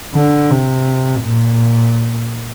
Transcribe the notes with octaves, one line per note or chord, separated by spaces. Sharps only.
D3
C3
A#2